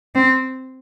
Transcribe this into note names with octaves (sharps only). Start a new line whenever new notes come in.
C4